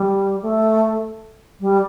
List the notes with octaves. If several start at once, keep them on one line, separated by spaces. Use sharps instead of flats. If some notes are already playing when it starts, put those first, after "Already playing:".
Already playing: G3
A3
G3